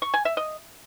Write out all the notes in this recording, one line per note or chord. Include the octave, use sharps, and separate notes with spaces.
C#6
G#5
E5
D#5